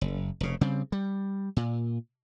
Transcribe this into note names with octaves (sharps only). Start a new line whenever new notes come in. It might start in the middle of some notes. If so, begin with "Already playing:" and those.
F#1
F1 C#3
C#3 G3 C4
G3
A#2